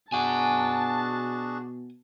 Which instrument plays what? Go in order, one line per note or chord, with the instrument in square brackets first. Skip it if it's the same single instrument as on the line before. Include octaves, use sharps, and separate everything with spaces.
[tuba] B2 [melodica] D4 F#4 G#4 [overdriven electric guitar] F#5 G#5 [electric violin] A5